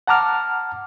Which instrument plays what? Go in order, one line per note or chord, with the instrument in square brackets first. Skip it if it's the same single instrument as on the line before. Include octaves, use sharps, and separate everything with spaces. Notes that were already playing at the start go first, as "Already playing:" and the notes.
[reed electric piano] F#5 A5 A#5 D6 F6